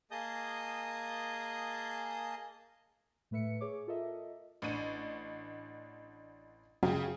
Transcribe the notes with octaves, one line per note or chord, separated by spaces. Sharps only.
A#3 G#4 D#5 A5 D#6 G6
A2 A3 B4 E5 C#7
G#4 C#5 D6
F4 A4 A#4 D#5 E5
A1 D4 D#7
F#2 C#3 G4 G#4